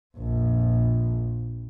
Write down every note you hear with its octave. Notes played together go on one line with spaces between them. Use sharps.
A#1 F2